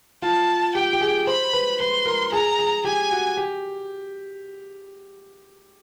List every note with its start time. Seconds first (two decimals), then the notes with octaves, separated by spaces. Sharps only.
0.22 F4 A5
0.75 G4 G5
0.93 G4
1.01 G#4
1.27 C5 B5
1.53 B4
1.80 B4 C6
2.06 A#4
2.32 G#4 A#5
2.59 G#4
2.85 G4 G#5
3.11 F#4
3.37 G4